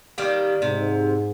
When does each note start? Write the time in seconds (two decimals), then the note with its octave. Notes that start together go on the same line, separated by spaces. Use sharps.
0.18 D#3 G3 A#3
0.62 G#2 C3